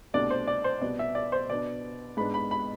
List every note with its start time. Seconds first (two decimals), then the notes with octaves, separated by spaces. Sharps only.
0.14 C2 B2 A3 D4 D5
0.30 C5
0.47 D5
0.64 C5
0.81 C2 B2 B3 D5
0.99 E5
1.15 D5
1.32 C5
1.50 B2 B3 D4 D5
2.17 G#2 G#3 B3 D4 B5
2.34 B5
2.51 B5